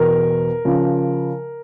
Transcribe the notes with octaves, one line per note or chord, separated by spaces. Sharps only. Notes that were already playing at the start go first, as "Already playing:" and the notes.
Already playing: E2 B2 A#4
C#3 F3